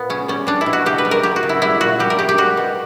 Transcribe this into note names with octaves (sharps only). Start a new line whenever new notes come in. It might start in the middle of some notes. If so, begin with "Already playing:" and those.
Already playing: A#2 B3
C#3 C#4
G3 C#4
G3 D4
E4
B2
F#4
C#3 G4
B4
G3
A#4
F#3 G4
F#4
C#3
E4
G3 E4
A#2 F#4
G3 G4
A#4
C#3 G4
G4
G3 F#4
B2